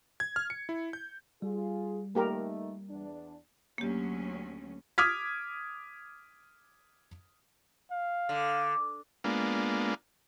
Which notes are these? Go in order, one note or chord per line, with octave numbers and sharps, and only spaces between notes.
G#6
F6
C#7
E4
G6
G3 F4 G#4
A3 A#3 D#4 G4 A#4
E2 D4
D2 F#3 A#3 C#4 G4
D6 D#6 F6 G#6 B6
F5
D3
G#3 A#3 B3 D4 F4